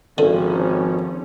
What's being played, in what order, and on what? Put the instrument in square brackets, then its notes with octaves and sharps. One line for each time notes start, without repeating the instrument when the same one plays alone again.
[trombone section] G#1 [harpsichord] D3 [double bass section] F3 C#4